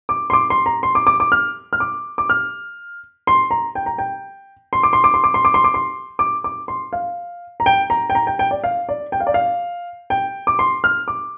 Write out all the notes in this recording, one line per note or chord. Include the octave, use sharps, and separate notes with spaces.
D6
C6
D6
C6
A#5
C6
D6
D6
D6
F6
F6
D6
D6
F6
C6
A#5
G5
A#5
G5
C6
D6
C6
D6
C6
D6
C6
D6
C6
D6
C6
D6
D6
C6
F5
A#5
G5
A#5
G5
A#5
G5
G5
D5
F5
D5
G5
F5
D5
F5
G5
D6
C6
F6
D6